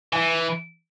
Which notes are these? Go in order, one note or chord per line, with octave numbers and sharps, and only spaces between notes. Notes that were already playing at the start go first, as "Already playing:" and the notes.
E3 G#5